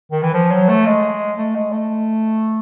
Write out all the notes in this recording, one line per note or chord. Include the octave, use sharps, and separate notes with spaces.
D#3
E3
F3
F#3
A3
G#3
A3
G#3
A3